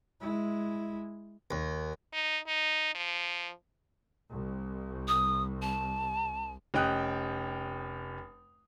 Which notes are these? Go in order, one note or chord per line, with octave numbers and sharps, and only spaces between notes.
G#3 E4
D#2
D#4
D#4
F3
C2
D#6
A5
F1 C#4 D#5 G5 D#6 F#6